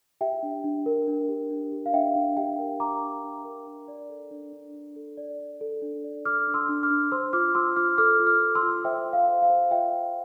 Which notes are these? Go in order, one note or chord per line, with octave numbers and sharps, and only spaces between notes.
G4 E5 G5
D4
D4
A#4
D4
G4
D4
G4
F5
D4 E5 G5
D4
G4 E5 G5
A#4
G4 A#5 D6
D4
D4
A#4
D4
D5
A4
D4
D4
D4
A4
D5
D5
A4
D4
D5
A4 D6 F6
D4
C6 E6
D4
D6 F6
D4
C5 C6 E6
F4 D6 F6
F4 C6 E6
F4 D6 F6
A4 D6 F6
F4
D6 F6
A4
C6 E6
F4
C5 E5 G5
F4
F5
C5
F5
C5
F4 E5 G5
F4